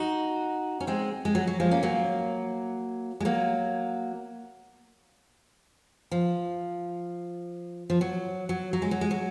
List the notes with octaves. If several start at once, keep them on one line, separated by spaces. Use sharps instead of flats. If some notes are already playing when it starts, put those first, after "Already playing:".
Already playing: D#4 F#4
C#4
G#3 C4
G#3
F#3
F#3
F3 G#3
A#3 C#4
F#3 A#3
G#3
F#3 A#3
F3
F3
F#3
F#3
F#3
G#3
F#3
G#3
F#3